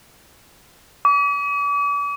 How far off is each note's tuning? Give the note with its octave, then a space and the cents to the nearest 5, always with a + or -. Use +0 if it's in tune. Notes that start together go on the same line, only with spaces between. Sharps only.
D6 -40